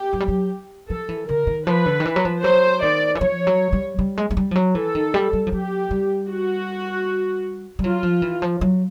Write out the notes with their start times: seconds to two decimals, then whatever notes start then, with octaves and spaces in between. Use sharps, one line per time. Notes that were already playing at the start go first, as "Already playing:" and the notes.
Already playing: G4
0.13 F#3
0.20 G3
0.28 F#3
0.90 F3 A4
1.09 E3
1.28 D3 A#4
1.47 D#3
1.66 F3 B4
1.86 D3
2.00 D#3
2.05 E3
2.16 F#3
2.25 F3
2.44 F#3 C5
2.82 D#3 D5
3.15 E3
3.21 F3 C#5
3.47 F#3
3.73 G3
3.99 G3
4.18 G#3
4.31 G#3
4.37 G3
4.51 F3
4.55 F#3
4.75 E3 A4
4.95 D#3
5.14 G3
5.33 G3
5.47 F3
5.52 F#3 G4
5.91 G3
6.30 F#4
7.79 G3
7.84 F#3 F4
8.03 F3
8.22 E3
8.42 F3
8.61 F#3